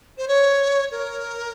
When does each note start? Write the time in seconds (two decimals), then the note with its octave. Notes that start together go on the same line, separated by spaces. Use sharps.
0.18 C5
0.28 C#5
0.92 A#4